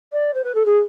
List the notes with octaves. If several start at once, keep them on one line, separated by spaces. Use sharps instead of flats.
D5
C5
B4
A4
G#4